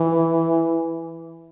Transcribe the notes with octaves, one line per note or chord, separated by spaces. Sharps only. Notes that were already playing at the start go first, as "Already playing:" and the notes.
Already playing: E3